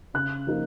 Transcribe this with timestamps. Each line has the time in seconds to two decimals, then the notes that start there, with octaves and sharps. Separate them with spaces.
0.14 C#3 F#6
0.47 F3 A#3 D#4